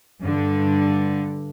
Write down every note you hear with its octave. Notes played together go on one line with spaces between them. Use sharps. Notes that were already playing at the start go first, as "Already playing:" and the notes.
G2 D3